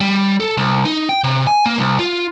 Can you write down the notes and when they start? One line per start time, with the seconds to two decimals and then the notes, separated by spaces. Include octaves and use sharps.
0.01 G3
0.40 A4
0.57 C2
0.85 D#4
1.09 G5
1.24 C3
1.47 G#5
1.66 A#3
1.78 C2
1.99 F4